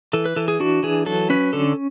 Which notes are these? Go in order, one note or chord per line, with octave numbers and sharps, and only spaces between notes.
E3 A4
B4
E3 A4
G#4
D4 F#4
E3 G#4
F#3 A4
C#4 B4
D3 A4